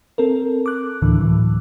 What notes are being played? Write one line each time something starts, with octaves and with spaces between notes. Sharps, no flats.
C4 A4 A#4
D6 F#6
D2 A2 D3 E3
A2 E3 F#3